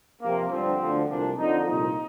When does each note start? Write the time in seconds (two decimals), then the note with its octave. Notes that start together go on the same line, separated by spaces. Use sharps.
0.22 F2 C3 F3 A#3
0.50 G2 D3 F3 C4
0.79 D2 D3 F3
1.08 C2 A#2 F3 D4
1.37 F2 D3 F3 D#4
1.66 C2 A#2 F3 D#4